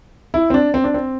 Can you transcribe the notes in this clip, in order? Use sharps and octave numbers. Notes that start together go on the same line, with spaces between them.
E4
C4
D4
C4
D4
C4